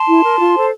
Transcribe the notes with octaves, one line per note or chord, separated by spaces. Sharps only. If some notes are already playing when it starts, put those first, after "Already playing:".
Already playing: A5 C6
E4
A#4
F4
A4 C5